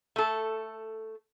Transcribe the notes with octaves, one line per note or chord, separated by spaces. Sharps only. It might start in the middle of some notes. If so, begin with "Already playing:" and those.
A3 A4